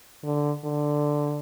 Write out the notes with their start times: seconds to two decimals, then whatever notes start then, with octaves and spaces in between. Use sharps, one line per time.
0.24 D3
0.64 D3